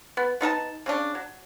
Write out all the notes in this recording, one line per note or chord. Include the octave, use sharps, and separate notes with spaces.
B3
B3 D#4 A#4 A5
C#3 C#4 D4
F#3